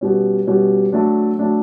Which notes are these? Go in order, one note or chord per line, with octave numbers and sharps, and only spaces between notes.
B2 G3 C#4
B2 G3 C#4
F#3 A3 D4
F#3 A3 D4